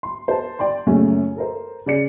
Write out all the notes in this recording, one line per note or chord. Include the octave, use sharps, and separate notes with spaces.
C6
C5 A5
D5 G5 C6
F#2 A#2 C#3 A3 C#4
A4 A#4 C5
C#3 D5 C#7